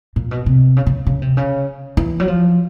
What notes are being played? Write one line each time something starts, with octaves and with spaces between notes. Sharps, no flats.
A#2
B2
C3
C#3
C#3
C#3
C3
C#3
E3
F#3
F3